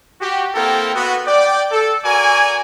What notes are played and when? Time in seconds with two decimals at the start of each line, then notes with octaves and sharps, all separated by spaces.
0.21 F#4 G4
0.55 A#3 C4 E4 A4 A#4 G5
0.95 B3 F#4
1.26 D5 G5
1.72 A4
2.04 F#4 A#4 D5 G#5